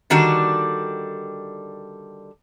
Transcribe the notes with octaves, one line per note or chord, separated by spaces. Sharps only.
D3 D#3 G3 D4 F#4